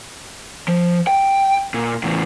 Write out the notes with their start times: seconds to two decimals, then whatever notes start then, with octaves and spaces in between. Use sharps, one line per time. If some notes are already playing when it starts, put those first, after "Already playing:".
0.68 F3
1.07 G5
1.74 A#2
2.03 E2 A2